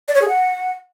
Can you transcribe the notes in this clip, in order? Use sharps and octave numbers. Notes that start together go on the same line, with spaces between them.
D5
C#5
G#4
F#5